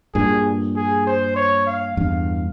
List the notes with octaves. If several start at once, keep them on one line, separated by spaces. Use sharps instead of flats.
G2 A#2 G#4
G#4
C5
C#5
F5
E2 G2 F5